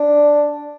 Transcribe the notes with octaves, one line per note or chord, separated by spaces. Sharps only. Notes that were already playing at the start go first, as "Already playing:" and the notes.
Already playing: D4